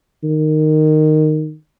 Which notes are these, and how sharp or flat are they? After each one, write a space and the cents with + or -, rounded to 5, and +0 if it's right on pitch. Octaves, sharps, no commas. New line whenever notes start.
D#3 -10